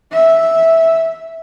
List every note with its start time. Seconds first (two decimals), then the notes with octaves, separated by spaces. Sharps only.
0.12 E5